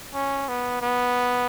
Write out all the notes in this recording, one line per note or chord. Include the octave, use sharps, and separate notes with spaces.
C#4
B3
B3